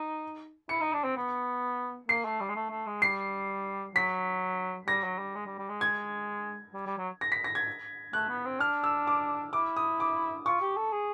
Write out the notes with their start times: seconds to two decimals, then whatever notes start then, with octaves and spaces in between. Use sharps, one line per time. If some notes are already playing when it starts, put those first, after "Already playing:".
Already playing: D#4
0.69 E4 C#7
0.81 D#4
0.93 D4
1.04 C4
1.17 B3
2.09 A#3 C7
2.25 A3
2.41 G3
2.49 G#3
2.56 A3
2.71 A3
2.86 G#3
3.02 G3 C7
3.95 F#3 B6
4.88 G3 A#6
5.04 F#3
5.19 G3
5.35 G#3
5.46 G3
5.58 G3
5.69 G#3
5.81 G#6
6.74 G3
6.86 G3
6.98 F#3
7.21 A#6
7.32 B6
7.44 A#6
7.55 G#6
8.13 A3 F#6
8.29 B3
8.45 C4
8.60 D4 F6
8.84 E6
9.07 D6
9.53 E4 D6
9.76 D#6
10.00 D6
10.46 F4 C#6
10.61 G4
10.77 A4
10.93 G#4